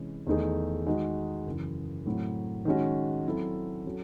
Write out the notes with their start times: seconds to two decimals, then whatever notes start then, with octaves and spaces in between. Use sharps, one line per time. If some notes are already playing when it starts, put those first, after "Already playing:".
Already playing: C3 E3 G#3 C#4
0.26 E2 D#3 A3 D#4 G#4
0.87 D#3 G#3 D#4 F#4
1.47 F#2 C#3 E3
2.06 A2 F#3 A3 C4 E4
2.65 D#3 G#3 C#4 F#4
3.26 F#3 C4 E4 A4
3.86 F#3 C#4 F#4 A4